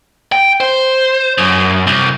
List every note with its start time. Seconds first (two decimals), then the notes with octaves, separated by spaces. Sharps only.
0.32 G5
0.60 C5
1.38 F#2
1.87 C2